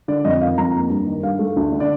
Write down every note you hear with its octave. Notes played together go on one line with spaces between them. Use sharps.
D3 D5
F2 D#5
D#3 F5
F2 A#5
A#3
G2
D#3
G2 F5
A3
D2
D3
D5